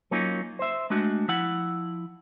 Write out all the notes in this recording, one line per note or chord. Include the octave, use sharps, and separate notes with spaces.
F#3 A#3 C#4 D#4 F4
C5 E5
G#3 A3 D4 F#4
F3 E4 F#5